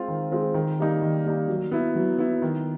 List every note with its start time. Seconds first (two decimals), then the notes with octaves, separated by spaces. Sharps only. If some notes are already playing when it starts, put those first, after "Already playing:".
Already playing: G#3 C4 F4
0.08 D#3
0.32 G#3 C4 F4
0.54 D#3
0.79 G3 A#3 D#4
1.02 D#3
1.25 G3 A#3 D#4
1.48 F#3
1.71 B3 E4
1.95 F#3
2.18 B3 E4
2.42 D#3